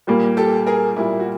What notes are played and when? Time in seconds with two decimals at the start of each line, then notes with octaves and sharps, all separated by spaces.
0.07 A#2 G3 A#3
0.37 G4 A4
0.67 G#4 A#4
0.96 A#2 G3 A#3 E4
1.20 F#4